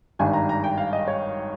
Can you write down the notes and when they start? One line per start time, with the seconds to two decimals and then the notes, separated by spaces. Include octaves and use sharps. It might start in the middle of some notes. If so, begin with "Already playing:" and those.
0.19 G#1 G2 D#3 G#5
0.33 A#5
0.49 A#5
0.64 G5
0.77 F5
0.93 D#5
1.08 C#5